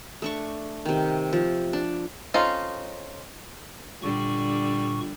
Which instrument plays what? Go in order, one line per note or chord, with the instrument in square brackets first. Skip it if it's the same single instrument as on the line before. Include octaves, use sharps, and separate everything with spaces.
[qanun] A3 D4 C#6
C3 D#3
F3
D4
[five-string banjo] C4 C#4 D#4 F4 A4
[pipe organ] A#2 C#6 [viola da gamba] D3 G3